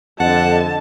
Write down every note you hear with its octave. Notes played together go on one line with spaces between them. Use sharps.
F2 D3 D#5 F#5 A5